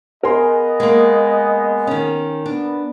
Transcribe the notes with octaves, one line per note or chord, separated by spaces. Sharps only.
B3 G#4 A#4 D#5 G#5 C6
G#3 A#3
D#3 C#4
B3 D4